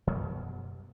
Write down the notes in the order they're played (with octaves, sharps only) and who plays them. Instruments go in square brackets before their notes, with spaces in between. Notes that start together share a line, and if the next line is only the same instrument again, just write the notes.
[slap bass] F#2 B2 F#3 G3